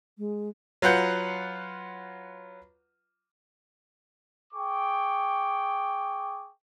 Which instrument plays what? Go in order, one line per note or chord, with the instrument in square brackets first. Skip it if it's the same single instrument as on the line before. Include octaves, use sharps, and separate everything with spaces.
[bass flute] G#3
[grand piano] F#3 F4 B4 F#5 G6 C#7
[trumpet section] G#4 G5 C#6 D6